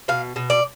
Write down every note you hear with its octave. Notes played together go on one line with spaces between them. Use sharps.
B2 F5
B2
D5